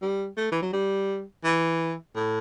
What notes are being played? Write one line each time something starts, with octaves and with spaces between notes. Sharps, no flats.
G3
A3
E3
F#3
G3
E3
A2